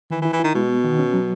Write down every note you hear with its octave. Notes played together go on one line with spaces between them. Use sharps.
D#3 E3
E3
E4
E3
D#3 E4
B2 G#3
B3
D#3
C#4
F#3